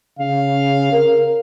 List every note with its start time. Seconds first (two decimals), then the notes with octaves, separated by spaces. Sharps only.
0.19 C#3 F5
0.92 A#4